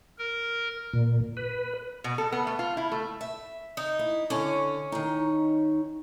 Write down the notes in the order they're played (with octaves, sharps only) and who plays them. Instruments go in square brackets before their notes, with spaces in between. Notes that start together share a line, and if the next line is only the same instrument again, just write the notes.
[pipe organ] A#4
[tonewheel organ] A#2
B4
[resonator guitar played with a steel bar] B2
A4
B3
A3
F4
E4
A3
[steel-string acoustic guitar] E5
[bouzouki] D#4
[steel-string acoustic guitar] E4
[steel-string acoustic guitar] D3 [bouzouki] C#4
[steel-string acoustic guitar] D#3 D#4